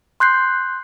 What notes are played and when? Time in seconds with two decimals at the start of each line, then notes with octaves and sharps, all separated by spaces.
0.20 C6 F#6 G6 C7